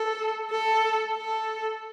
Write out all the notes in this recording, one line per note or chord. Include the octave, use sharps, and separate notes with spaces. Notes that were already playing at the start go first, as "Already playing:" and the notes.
Already playing: A4
A4
A4